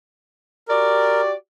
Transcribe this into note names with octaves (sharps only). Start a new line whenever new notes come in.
F#4 G4 A#4 D5